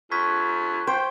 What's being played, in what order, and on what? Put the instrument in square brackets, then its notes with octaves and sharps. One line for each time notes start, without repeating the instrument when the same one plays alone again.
[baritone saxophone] F2 [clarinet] F4 [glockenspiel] C#6 G#6 B6
[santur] C5 [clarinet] G5